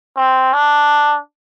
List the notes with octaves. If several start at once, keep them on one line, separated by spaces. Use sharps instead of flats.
C4
D4